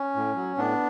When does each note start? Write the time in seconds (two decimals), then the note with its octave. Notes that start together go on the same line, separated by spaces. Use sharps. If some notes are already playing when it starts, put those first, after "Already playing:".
Already playing: C#4
0.16 A2
0.36 F#3
0.57 A2 B3 D4